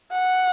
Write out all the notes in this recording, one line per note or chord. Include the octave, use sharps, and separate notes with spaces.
F#5